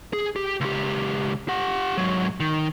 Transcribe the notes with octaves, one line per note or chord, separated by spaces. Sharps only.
G#4
G4
C#2 G4
G4 F#5
G#2 F#3
D#3